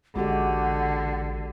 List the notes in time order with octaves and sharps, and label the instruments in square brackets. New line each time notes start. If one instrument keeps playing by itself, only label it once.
[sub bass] A1 [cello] D3 [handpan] G#3 F#4 G4 [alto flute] F#5